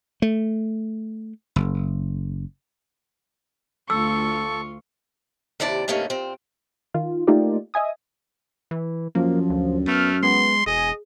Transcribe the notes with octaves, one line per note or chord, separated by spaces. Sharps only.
A3
F#1
D2 F4 A4 C#6 E6
D#2 C3 E4 D5 A5
G2 C3 A3 A#3 C#4 D#4
A#2 C4
D#3 F4
A3 A#3 D#4 F4 G4 D5
D#5 E5 G#5 D#6
E3
F#2 F3 A#3
D2
A3 B3 F6
G#3 B3 C6
E1 G#4 D#5